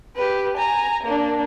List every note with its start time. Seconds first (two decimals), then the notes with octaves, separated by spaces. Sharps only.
0.16 G4 B4
0.57 G#5 A#5
1.03 A#3 D4